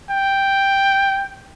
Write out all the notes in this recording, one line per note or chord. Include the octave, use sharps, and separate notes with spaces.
G5